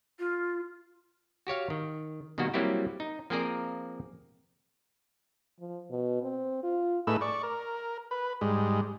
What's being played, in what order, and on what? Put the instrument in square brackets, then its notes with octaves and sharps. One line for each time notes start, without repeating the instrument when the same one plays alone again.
[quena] F4
[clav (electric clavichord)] F#4 G4 C#5 F5
D#3
B2 D#3 G3 A#3 F#4
F#3 G3 A#3 C4 E4 G4
D#4
F3 A#3 C4 G#4 A#4 D5
[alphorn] F3
B2
C4
F4
[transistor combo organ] A2 A3 D#4 G#4 B4 E6
D5 C#6
A#4
B4
G#2 G3 G#3